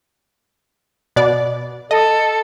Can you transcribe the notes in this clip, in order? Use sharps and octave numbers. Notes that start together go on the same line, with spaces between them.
B2 D5
A4 D#5